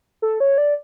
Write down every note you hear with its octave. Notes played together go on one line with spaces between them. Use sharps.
A4
C#5
D5